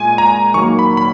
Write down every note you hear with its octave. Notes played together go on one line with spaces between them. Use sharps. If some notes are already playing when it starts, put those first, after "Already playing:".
Already playing: A#2 G#3 G#5
A#5
D#3 F#3 A#3 C#6
B5
B5